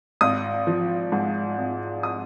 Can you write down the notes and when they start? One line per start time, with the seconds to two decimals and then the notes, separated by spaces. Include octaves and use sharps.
0.21 G#1 D#6
0.67 F3
1.12 G#2
1.58 G#1
2.03 D#6